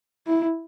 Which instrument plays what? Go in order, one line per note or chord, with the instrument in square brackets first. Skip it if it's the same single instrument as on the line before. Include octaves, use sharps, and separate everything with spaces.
[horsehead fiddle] E4